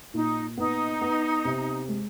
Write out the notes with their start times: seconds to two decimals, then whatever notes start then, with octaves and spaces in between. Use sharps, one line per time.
0.14 A#2 D#4
0.57 B3 D#4
1.01 B3
1.45 C3
1.88 G#3